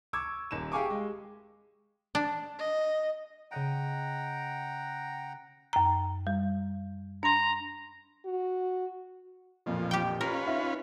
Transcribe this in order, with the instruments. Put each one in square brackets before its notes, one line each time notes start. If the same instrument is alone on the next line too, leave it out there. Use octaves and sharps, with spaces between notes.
[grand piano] C#6 D6 E6 G#6
D#1 E7
G4 G#4 F5 G#5 C#6 D6
G#3
[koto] D4
[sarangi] D#5
[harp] C#3 D#5 D7 [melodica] F#5 G5 A#5
[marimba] F#2 A#5
G3
[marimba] D4 C6 [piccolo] A#5
[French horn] F#4
[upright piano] A1 F2 A#2 [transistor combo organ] F3
[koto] G4 G5
[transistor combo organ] C#4 F4 B4 [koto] A#4
[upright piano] D#4 E5 F5